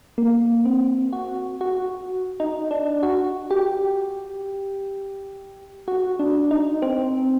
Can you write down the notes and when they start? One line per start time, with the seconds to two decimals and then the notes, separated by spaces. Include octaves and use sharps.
0.18 A#3
0.65 C4
1.13 F#4
1.61 F#4
2.40 D#4
2.71 D4
3.03 F#4
3.51 G4
5.88 F#4
6.19 D4
6.51 D#4
6.82 C4